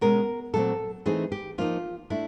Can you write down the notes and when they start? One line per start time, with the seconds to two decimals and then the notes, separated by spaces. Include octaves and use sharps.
0.01 B2 G#3 C#4 A#4
0.53 A#2 F#3 A3 C4 A4
1.06 E3 A3 C4 D#4 G#4
1.32 G4
1.58 F3 A#3 D#4 F4
2.10 A3 D4 E4